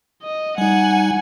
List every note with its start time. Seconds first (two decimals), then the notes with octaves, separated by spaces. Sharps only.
0.22 D#5
0.58 G3 D#4 F#5 G#5